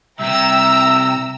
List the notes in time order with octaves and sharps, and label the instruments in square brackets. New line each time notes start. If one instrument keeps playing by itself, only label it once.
[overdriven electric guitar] C2 C3 [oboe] E5 [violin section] G5 A#5 E6